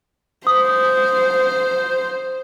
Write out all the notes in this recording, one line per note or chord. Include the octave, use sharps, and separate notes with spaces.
C5 D#6